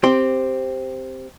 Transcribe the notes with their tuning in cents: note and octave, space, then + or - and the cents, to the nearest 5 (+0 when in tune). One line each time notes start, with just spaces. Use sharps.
C4 +0 G4 +0 C6 +0